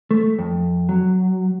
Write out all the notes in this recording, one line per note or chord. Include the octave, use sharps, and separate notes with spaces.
A3
F2
F#3